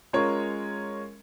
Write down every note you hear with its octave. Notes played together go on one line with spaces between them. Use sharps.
G#3 C#4 F4 A#4 C#5